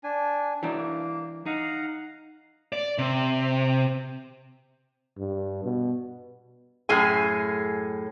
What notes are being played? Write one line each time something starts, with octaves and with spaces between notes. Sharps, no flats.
D4 G#5
E3 F#3 D4 D#4
A#3
D#4 F5 F#5 A#5
D5
C3
G2
B2
F#2 A2 G#4 G#5